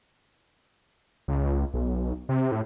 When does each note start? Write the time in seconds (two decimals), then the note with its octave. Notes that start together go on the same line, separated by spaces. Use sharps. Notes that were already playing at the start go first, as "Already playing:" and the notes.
1.28 C#2
1.74 B1
2.29 C3
2.52 A2